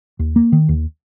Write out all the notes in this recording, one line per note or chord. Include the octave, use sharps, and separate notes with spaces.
D#2
A#3
D#3
D#2